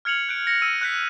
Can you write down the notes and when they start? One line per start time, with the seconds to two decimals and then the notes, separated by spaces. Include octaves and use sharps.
0.05 F6 G#6 C#7 F7 F#7
0.29 F#6 G6 D7
0.47 A#6 C#7
0.62 E6 D#7
0.81 F#6 G6 B6